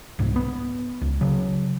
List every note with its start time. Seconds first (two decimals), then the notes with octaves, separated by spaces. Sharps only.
0.19 C2 G#2
0.36 B3
1.02 C#2
1.21 C#3 F#3